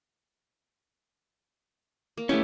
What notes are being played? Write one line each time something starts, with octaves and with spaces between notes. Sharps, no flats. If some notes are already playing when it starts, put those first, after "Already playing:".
A#3
A3 B3 C#4 E4 G4 G5